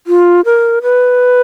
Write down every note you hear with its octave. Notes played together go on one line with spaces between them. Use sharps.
F4
A#4
B4